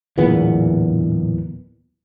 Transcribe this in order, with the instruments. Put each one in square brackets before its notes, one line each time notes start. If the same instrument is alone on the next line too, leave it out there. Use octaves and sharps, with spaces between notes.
[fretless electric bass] D1 E2 A#2 B3